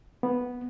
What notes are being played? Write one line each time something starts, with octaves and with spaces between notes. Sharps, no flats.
B3